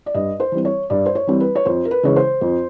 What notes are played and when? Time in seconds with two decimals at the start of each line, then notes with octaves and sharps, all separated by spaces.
0.06 D5
0.14 G2 D#5
0.40 C5
0.52 E3 G3 C4
0.65 C#5
0.90 G2 D5
1.06 C5
1.15 C#5
1.27 E3 G3 C4
1.40 B4
1.55 C#5
1.65 F2 C5
1.85 A#4
1.91 B4
2.03 C#3 E3 G#3 C#5
2.16 C5
2.41 F2